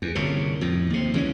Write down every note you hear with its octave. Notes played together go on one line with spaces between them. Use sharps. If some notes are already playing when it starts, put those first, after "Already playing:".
E2
G1 C2 A#2 C#3
F2 A2
D#2 C3
C#2 E3 A3 C#4